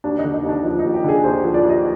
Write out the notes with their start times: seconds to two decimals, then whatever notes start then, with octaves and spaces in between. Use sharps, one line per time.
0.04 D#2 D4
0.19 D#4
0.24 D3
0.34 D#4
0.43 D#2
0.49 D4
0.64 F3 D#4
0.79 D#4
0.84 D#2
0.94 G4
1.04 D3 G#4
1.24 D#2 C5
1.44 F3
1.54 D5
1.64 D#2
1.70 D#5